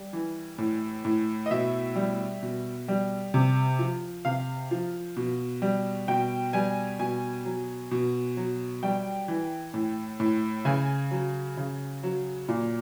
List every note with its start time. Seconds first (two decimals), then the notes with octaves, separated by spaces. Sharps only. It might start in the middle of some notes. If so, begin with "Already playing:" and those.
Already playing: G3
0.13 E3
0.58 A2
1.05 A2
1.46 D#5
1.51 B2 E5
1.96 G3
2.42 B2
2.88 G3
3.34 C3
3.79 F3
4.25 C3 F5
4.71 F3
5.17 B2
5.62 G3
6.08 B2 G5
6.53 G3 G#5
6.99 B2 G#5
7.45 F#3
7.91 B2
8.37 F#3
8.83 G3 G5
9.28 E3
9.74 A2
10.20 A2
10.65 C#3 G#5
11.11 F#3
11.57 C#3
12.03 F#3
12.48 A#2